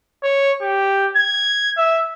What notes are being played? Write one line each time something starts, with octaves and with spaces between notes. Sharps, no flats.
C#5
G4
G#6
E5